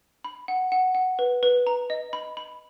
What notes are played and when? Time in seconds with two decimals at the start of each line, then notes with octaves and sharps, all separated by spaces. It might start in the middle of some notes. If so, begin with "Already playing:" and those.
0.24 B5
0.48 F#5
0.72 F#5
0.95 F#5
1.19 B4
1.43 B4
1.67 A#5
1.90 D#5
2.13 B5
2.37 B5